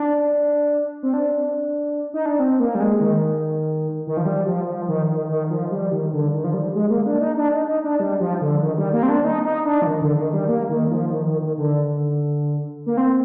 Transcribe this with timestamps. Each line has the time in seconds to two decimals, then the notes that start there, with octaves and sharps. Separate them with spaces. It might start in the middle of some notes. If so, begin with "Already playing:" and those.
Already playing: D4
1.03 C4
1.14 D4
2.14 D#4
2.26 D4
2.39 C4
2.60 A#3
2.75 G3
2.80 G#3
3.00 D#3
4.07 D#3
4.17 F3
4.26 G3
4.46 F3
4.67 F3
4.88 D#3
5.08 D#3
5.29 D#3
5.50 F3
5.71 G3
5.92 D#3
6.13 D3
6.33 D#3
6.44 F3
6.54 G3
6.75 G#3
6.90 A#3
7.06 D4
7.21 D#4
7.37 D4
7.52 D#4
7.68 D#4
7.84 D4
8.00 G3
8.20 F3
8.41 D3
8.62 D#3
8.78 G3
8.93 A#3
9.03 C4
9.09 D4
9.24 D#4
9.45 D#4
9.66 D4
9.82 F3
9.87 D#3
10.02 D3
10.18 D#3
10.33 G3
10.49 A#3
10.69 D#3
10.91 F3
11.11 D#3
11.27 D#3
11.42 D#3
11.58 D3
12.86 A#3
12.97 C4